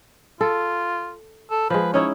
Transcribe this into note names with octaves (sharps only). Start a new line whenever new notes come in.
F4 A4
A4
F3 G#3 B4
C#4 D#4 E4 C#5